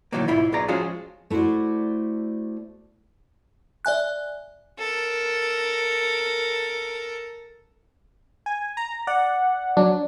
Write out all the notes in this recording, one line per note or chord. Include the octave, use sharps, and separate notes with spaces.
B1 A2 D#3 E3 F#3 A#3
B1 G#2 E4 F4 F5 B5
B1 B2 G#4 D5 A#5
F3 G#3 C#4 F4 F#4 G#4
A3 E4 F#4 C5 D5
D5 E5 G#5 F#6
A4 A#4
G#5
A#5
D5 F#5
F#3 D4